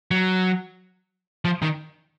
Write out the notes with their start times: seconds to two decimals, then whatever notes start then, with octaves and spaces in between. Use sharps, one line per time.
0.11 F#3
1.45 F3
1.62 D#3